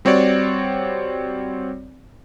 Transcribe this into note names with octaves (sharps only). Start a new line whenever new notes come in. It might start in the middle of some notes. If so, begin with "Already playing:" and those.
G3 C4 F#4 C#5 D5